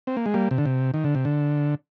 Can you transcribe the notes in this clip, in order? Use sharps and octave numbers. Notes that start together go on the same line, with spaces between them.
C4
A#3
G#3
G3 A#3
C3
D3
C3
D#3
D3
C3
D3